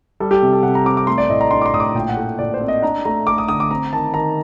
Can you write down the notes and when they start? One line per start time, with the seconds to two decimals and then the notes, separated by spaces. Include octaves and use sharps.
0.20 G3 A4
0.31 G4
0.42 C3
0.53 A4
0.63 C3 F#5
0.75 A#5
0.85 C4 D6
0.97 D6
1.07 A3 C6
1.18 D5
1.29 A2 D#5
1.41 A#5
1.51 D4 C6
1.61 D6
1.66 C6
1.73 A2 D#6
1.80 D6
1.95 A#2 G5
2.09 F#5
2.17 A3
2.39 A#2 D5
2.54 C5
2.61 C4
2.68 D#5
2.82 D4 A#5
3.05 A3 A#5
3.27 A3 D6
3.38 D#6
3.48 D3 D#6
3.60 D6
3.71 C4 A#5
3.92 D#3 A5
4.14 D#3 A#5